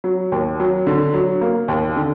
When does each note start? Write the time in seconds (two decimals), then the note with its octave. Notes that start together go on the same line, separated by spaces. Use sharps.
0.04 F#3
0.32 D#2
0.60 F#3
0.87 D3
1.14 F#3
1.41 A#3
1.68 D#2
1.96 D3